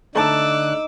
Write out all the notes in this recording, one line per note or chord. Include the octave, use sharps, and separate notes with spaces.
D3 A3 D4 D#4 A5 D6 E6 F#6